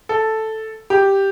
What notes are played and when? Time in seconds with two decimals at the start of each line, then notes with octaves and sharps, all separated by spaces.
0.09 A4
0.90 G4